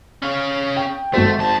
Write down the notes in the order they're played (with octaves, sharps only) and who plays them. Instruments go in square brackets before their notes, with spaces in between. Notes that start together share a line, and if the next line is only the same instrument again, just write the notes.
[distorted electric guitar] C#4 F5
[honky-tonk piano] G5
[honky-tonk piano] G#1 F#4 C5 [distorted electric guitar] A3
[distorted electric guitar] F2 A5